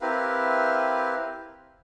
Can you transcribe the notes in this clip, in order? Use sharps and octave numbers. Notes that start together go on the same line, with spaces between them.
C4 E4 G4 A#4 B4 F5